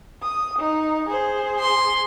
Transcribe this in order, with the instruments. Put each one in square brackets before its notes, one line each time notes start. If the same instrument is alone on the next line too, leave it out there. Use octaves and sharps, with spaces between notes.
[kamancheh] D#6
D#4
G#4 C5
[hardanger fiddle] C6